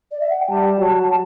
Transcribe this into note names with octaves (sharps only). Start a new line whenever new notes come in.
D5
E5
F#5
G5
G3 A5
F#3